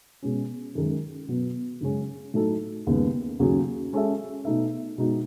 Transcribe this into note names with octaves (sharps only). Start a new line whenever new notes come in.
B2 G#3 C#4
F#2 D#3 G#3
B2 F#3 B3
F#2 C#3 G#3 C#4
A2 F#3 A3 D#4 A4
D#2 C#3 G#3 B3
D#2 C#3 F#3 C#4 G#4
G#3 C#4 F#4 A4 E5
B2 A3 D#4 A4 E5
B2 G#3 D#4 F#4